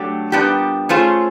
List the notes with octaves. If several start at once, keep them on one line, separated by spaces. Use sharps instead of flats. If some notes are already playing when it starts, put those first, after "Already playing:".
Already playing: F#3 A3 D4 G4
A#2 G3 B3 D4 G4
A3 C#4 F4 G#4 C5